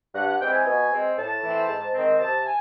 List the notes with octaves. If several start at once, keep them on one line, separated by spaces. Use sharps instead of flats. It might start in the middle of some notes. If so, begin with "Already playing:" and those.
G2 F#5
F#5
E3 G#3 C4 G5
G#5
B2
G#3 C4
A2 A5
E3 A3 C4
G#2
D#3 G#3 C4
C3 A5
G#5